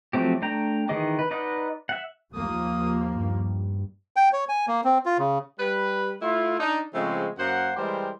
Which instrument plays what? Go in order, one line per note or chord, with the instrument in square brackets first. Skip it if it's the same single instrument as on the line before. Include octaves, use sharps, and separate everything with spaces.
[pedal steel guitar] F3 F#3 A3 C4 G4
A3 D4 G5 A#5
D#3 E3 G#4 D#5 D6
B4
D#4 B4 D5 D#5 F#5
E5 F#5
[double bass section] D#2 F3 A#3 [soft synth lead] D#6
[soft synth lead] G2
[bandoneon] G5
C#5
G#5
A#3
C4
F4
C#3
[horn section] G3 B4
A3 E4 F4
D4 D#4
C#3 F3 G#3 A3 C4
F#2 A#3 A#4 C5 F#5
E3 G3 G#3 G4 A#4 C5